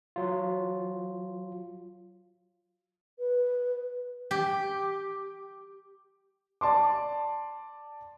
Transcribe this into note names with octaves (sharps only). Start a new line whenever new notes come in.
F#3 F4
B4
G4
D5 A5 C6 D6